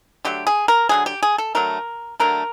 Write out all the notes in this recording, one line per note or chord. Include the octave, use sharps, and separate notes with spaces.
D3 F#3 A3 G4
G#4
A#4
D3 F#3 A3 G#4
G4
G#4
A4
D3 F#3 A3 A#4
D3 F#3 A3 A#4